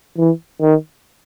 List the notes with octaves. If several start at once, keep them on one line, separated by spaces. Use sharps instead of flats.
E3
D#3